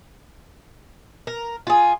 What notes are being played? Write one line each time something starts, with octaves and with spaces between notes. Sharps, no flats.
A#4
F4 G#4